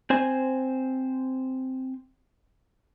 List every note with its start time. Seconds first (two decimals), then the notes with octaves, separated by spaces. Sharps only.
0.10 C4 C5 G#5